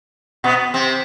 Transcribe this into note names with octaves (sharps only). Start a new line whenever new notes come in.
B2 B3
C3 C4